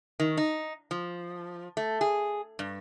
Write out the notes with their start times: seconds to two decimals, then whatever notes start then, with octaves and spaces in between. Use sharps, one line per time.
0.20 D#3
0.37 D#4
0.91 F3
1.77 A3
2.01 G#4
2.59 G2